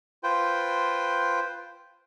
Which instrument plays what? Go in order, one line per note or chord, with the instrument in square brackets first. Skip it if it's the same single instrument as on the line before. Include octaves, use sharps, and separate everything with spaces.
[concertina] F4 B4 C5 G5